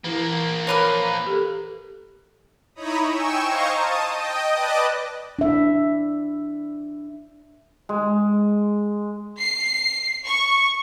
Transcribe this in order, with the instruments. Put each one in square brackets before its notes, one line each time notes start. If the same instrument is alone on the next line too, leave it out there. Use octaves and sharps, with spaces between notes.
[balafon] E3 E4 [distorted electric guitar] F3 A#3
[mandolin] A#4 B4 F5 [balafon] C#5 A5 D6
[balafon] G4 A4
[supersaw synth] D#4 E4 C#5 A#5 B5 D#6
G5 G#5 C#6 E6
C5 D#5 F5 A#5 C#6 G#6
A5 D#6
D#5 G5
B4 D5 D#5 A5 D6 F#6
[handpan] D4 E5
[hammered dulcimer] G#3
[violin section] C7
C#6